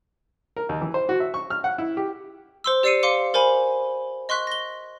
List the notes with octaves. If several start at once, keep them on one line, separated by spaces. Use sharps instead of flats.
A#4
D#2
E3
C5
F#4
E5
C#6
F6
F#5
E4
G4
C5 C6 E6
G4 D5 E6 C7 C#7 D#7
F5 C6 D6 C#7
A#4 C5 G#5 B5
D#5 C6 C#6 F#6 B6
A#6 G7